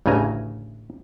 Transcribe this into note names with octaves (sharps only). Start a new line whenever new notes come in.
A1 D2 C#3 E3 G#5 A#5